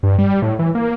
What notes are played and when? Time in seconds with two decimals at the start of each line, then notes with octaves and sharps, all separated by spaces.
0.03 G2
0.18 G3
0.42 A2
0.59 E3
0.75 A#3